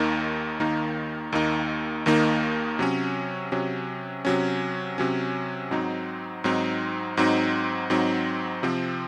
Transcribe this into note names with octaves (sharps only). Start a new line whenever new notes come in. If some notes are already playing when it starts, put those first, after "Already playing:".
Already playing: D#2 D#3 A#3 D#4
D#2 D#3 A#3 D#4
D#2 D#3 A#3 D#4
D#2 D#3 A#3 D#4
C3 F#3 C#4
C3 F#3 C#4
C3 F#3 C#4
C3 F#3 C#4
G#2 F#3 C4 D#4
G#2 F#3 C4 D#4
G#2 F#3 C4 D#4
G#2 F#3 C4 D#4
C3 F3 C4